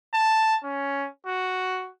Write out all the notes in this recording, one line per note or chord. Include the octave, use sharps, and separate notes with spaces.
A5
C#4
F#4